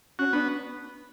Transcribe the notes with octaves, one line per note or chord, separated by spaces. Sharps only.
C#4 F#4
B3 D4